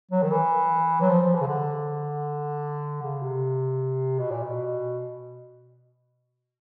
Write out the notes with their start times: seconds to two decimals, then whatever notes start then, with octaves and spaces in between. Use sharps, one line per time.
0.11 F#3
0.23 D#3
0.31 E3
1.01 F#3
1.09 F3
1.21 F3
1.35 E3
1.41 C#3
1.47 D3
3.03 C#3
3.22 C3
4.19 B2
4.31 A#2
4.43 B2